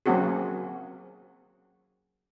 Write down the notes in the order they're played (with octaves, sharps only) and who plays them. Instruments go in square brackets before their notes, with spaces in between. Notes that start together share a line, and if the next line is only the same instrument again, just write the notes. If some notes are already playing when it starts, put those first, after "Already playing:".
[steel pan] F#3 A#3 C4 C#4 F#4 G#4